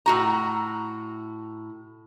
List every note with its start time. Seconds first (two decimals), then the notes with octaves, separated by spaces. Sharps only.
0.06 A2 F#4 A#5